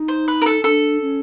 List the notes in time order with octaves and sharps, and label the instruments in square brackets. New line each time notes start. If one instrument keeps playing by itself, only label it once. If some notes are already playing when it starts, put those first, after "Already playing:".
Already playing: [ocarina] D#4
[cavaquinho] C5
B4
A#4
A4
[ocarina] D4 [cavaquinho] A4
[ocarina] C#4